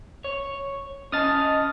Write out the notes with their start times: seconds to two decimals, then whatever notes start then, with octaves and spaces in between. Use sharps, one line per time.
0.24 C#5
1.12 C#4 D#5 A5 D#6 F6 A6